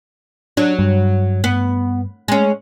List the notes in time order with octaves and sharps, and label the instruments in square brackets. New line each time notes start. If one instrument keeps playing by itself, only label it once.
[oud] F#3 [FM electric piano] D4
[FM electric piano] G2
[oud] B3
G#3 C#4